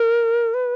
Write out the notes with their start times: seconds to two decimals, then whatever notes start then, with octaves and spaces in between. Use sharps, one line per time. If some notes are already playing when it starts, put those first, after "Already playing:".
Already playing: A#4
0.54 B4